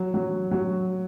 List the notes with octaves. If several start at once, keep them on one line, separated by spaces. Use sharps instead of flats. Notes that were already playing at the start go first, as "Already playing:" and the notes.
Already playing: F#3
F#3
F#3